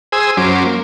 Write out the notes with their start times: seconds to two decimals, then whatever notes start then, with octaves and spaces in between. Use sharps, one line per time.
0.12 G#4 C5 G#5 D#6 E6
0.37 F#2 F#3 C#4 C5 D6
0.65 A#3